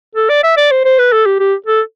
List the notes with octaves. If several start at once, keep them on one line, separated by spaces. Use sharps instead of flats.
A4
D5
E5
D5
C5
C5
B4
A4
G4
G4
A4